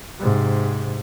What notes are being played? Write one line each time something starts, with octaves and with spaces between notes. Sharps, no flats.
G#2 C3